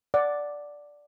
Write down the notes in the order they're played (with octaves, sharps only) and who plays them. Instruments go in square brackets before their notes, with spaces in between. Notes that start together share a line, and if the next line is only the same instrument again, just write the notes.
[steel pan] D5 F#5